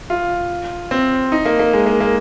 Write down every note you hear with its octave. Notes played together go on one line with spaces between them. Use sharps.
F4
C4
D#4
A#3
A#3
G#3
A#3
A#3